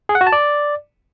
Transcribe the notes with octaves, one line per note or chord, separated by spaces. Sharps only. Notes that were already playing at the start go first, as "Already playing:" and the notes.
G#4
F#5
F#4
A5
D5